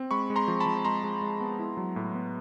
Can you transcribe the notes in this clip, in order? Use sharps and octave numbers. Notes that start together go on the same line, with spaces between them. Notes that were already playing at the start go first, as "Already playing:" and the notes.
Already playing: C4
G#3 B5 C#6
G#3
A#5 C6
F3
A5 B5
F3
G#3 A#5 C6
G#3
G#3
B3
E4
F#3
A2
B3